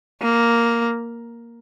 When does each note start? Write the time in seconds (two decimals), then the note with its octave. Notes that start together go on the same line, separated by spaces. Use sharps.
0.21 A#3